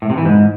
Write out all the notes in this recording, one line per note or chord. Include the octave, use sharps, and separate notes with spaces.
A2
C3
E3
G#2